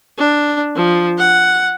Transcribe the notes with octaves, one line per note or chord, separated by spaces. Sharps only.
D4
F3
F#5